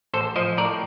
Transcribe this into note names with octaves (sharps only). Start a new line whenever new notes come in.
A1 A4 C5
F3 C5 D#5
A2 A#4 D5